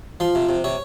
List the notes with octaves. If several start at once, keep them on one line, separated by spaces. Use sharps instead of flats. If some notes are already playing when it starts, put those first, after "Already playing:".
F3 C6
C3
C3
C3 C#5